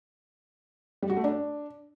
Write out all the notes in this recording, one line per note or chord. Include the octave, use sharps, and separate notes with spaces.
G3
F#4
A3
D4